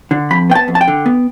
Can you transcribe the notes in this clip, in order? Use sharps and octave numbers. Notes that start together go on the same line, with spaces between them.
D3
F2 B5
B3 G5
A5
F2
A5
G5
D3
B3